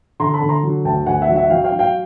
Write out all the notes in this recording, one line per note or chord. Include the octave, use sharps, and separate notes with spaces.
D3 A#5 C6
A5 B5
D3
A#5 C6
F#3
D2 G5 A5
D2 F#5 G#5
E5 F#5
F#3
E5 F#5
F#3 F5 G5
F5 G5
F#3
F5 G5